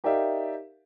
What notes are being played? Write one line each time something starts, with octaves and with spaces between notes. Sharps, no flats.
D#4 G4 A#4 D5 E5 F5